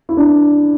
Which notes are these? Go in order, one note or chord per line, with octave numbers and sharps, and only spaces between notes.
E4
D4